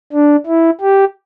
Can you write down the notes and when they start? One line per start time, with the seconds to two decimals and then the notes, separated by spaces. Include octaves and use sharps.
0.13 D4
0.46 E4
0.81 G4